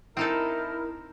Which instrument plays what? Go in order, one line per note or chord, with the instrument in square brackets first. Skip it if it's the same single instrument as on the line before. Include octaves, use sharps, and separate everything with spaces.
[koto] C4 D#4 A4 [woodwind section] E4 A#4